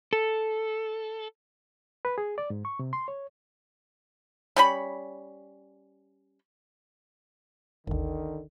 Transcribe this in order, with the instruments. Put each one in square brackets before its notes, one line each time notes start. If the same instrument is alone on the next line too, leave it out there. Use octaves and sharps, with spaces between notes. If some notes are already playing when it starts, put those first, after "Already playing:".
[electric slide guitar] A4
[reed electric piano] B4
G#4
D5
G#2
C#6
C3
C6
C#5
[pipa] G3 C#4 B5
[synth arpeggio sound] G1 D2 [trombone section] D3 D#3